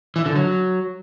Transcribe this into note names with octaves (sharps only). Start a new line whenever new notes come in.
E3
D3
F#3